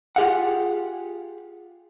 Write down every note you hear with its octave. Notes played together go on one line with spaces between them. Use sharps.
F4 G4 G#4 F5 F#5